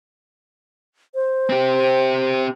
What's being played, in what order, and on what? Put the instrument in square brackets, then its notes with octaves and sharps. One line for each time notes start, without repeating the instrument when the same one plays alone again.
[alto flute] C5
[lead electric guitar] C4 G4